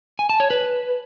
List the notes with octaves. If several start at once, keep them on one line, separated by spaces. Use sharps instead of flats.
G#5
A5
C#5
B4